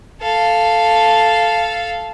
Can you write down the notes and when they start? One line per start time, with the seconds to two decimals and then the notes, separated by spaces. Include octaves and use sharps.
0.21 A4 F5